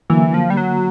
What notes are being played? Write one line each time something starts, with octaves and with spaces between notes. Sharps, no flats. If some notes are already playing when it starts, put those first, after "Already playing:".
D3 E3 F#3 A#3
F3
G3
F#3